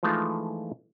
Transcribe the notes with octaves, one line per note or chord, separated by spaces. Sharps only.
E3 F3 G#3 A3 D#4 F4